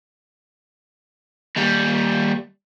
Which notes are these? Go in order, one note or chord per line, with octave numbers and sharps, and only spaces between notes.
D#2 G3